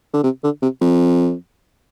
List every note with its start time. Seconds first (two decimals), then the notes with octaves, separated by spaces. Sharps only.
0.14 D3
0.24 C3
0.44 D3
0.62 C3
0.81 F2